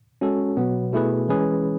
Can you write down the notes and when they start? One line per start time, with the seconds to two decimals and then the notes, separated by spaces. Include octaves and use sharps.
0.21 G#3 C#4 F#4 A4
0.57 B2 F#3 B3
0.93 B2 A3 E4 G#4 B4
1.28 E3 G#3 C#4 G#4 B4